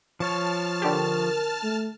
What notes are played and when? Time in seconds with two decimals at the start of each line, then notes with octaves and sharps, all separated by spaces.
0.20 F3 C#5 A5 F6
0.82 D3 G4 A#4
1.63 A3